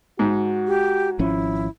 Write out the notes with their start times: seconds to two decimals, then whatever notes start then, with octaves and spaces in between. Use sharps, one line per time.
0.19 G#2 F#4
0.67 G4
1.19 G#1 F3 C#4 E4